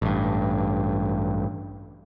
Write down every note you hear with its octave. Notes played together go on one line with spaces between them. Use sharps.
A1 G2